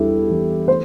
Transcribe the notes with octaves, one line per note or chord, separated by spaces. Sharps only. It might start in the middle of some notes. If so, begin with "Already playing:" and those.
Already playing: E2 G3 D4 E4 G4 A4
E3
A3 C5